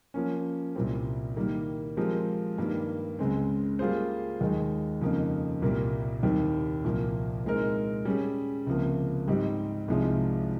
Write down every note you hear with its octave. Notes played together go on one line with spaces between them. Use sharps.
F3 A#3 C#4
C2 A#2 G3 C4
D#3 G3 A#3
F3 G#3 C4 G4 A#4
G2 D#3 G3 A#3
C#2 C#3 G#3 C4
G3 A#3 F4 G#4 C5
D#2 D#3 G#3 D#4
F2 C#3 F3 A#3 D#4
C2 A#2 G3 A#3
D#2 D#3 G3 C4 G4
C2 A#2 F3 A#3
A#2 G#3 C4 D#4 A#4
G3 C#4 G#4
C#2 C3 F3 A#3
G#2 G3 C4 D#4 G4
C2 C3 F3 G#3 D#4